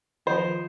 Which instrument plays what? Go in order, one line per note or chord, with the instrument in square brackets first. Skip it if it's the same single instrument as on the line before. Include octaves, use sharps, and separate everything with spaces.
[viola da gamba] D#3 F3 [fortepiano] C5